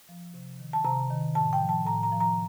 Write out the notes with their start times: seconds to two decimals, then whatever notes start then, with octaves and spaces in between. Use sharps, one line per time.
0.09 F3
0.34 C3
0.59 D#3
0.73 A5
0.85 C3 A#5
1.11 D#3
1.35 A2 A5
1.53 G5
1.61 F3
1.69 A5
1.86 A2 A#5
2.03 A#5
2.12 F3
2.21 A#5